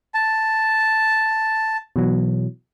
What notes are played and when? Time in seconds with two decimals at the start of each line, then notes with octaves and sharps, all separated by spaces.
0.14 A5
1.96 B2 E3 F#3